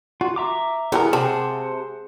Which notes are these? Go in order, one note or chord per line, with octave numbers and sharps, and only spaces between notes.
F4 F#4
E5 A#5 D6
E3 B3 G4 G#4 A#4
C3 C4 C5 F#5 A5